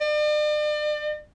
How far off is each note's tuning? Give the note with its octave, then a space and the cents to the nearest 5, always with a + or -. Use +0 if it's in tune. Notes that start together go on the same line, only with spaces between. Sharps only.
D5 +40